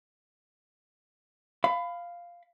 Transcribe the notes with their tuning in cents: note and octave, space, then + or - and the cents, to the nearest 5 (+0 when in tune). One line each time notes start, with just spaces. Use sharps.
F5 -5 B5 +25